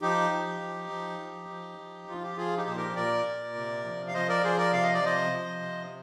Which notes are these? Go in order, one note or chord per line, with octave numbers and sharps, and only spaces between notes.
F3 D#4 G4
F3
F3
F3
F3
F3
F3
F3 F4
G4
F3 F4 G#4
D#4 G4
A#2 C5
G4 A#4
A#2 A#4 D5
A#2
C3
F3
F5
F3 C5 D#5
A#4 D5
F3 G#4 C5
A#4 D5
C3 F5
D#5
D5
F3 C5 D#5
F3
C3